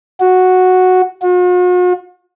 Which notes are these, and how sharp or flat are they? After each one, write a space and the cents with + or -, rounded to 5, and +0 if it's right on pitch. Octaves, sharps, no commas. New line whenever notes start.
F#4 -5
F#4 -45